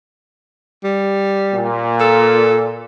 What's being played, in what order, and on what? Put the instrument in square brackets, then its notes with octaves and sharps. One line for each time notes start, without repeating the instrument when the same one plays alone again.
[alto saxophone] G3
[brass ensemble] A#2
[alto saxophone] A4